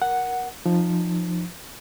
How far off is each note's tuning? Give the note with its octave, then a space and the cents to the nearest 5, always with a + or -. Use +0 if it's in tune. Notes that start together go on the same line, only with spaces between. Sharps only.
A#4 +15 F#5 +0
F3 +0 D#4 -25